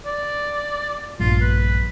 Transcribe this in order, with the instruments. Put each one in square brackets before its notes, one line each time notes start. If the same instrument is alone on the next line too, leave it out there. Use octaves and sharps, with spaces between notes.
[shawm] D5
[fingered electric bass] A#1 G2 A#2 [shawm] F4
[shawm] B4